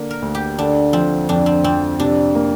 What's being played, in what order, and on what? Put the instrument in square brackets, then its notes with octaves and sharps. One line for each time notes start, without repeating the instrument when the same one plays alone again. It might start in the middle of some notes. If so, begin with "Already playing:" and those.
Already playing: [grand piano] D3 A#3 D4
[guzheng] A#4
[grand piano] D2
[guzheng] G4
[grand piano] D3 [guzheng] D4
[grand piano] F3 [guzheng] C4
[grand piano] F2 [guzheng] D4
[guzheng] C4
[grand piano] F2 [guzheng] C4
[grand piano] C3 [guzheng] D4
[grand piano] A#3